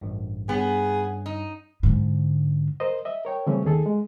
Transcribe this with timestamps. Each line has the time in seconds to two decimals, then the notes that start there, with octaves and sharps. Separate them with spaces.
0.01 A1 G2
0.49 G2 B3 C#4 G#4
1.26 D#4
1.83 G#2 D3
2.80 A#4 C5 D#5
3.05 D#5 E5
3.25 A#4 C#5 G5
3.47 C#3 E3 G3 A3 C4 C#4
3.65 D#2 D#3 G#4 A4
3.86 G#3